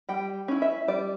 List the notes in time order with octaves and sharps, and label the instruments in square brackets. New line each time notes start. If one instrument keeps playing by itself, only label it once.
[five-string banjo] G3 G5
C#4 E4
E5
G3 D5